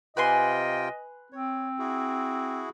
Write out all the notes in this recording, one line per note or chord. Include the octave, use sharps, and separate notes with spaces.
C3 F4 B4 D#5 G5 G#5 C6
C4 C#5
E4 F#4 G#4